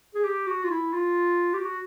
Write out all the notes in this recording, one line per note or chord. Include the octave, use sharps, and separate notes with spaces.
G#4
G4
F#4
F4
E4
F4
G4
F#4